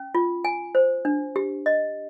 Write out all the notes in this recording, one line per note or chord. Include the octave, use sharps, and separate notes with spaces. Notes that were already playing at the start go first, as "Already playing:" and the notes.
Already playing: C#4
F4
G#5
C5
D4
G4
D#5